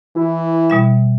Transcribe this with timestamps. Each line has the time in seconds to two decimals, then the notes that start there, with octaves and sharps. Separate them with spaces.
0.16 E3 E4
0.70 B2 G3 E5